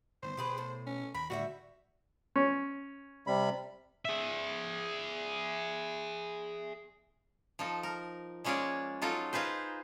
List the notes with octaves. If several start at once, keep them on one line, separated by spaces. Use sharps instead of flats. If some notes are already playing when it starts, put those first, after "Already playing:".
G1 D#3 B3 C5
B2 G4 G#4 B4
A2
C#4
D#2 A#4 B5
A2 D3 D#3 G3 F#4 D#5 E5
C#4
C3 G3 B5
G#4 E5
F3 D#4 A4
A#4
G#3 A#3 C#4 G#4 C#5 D5
F#3 D#4 F4 A4
D#4 F4 G#4 B4 C5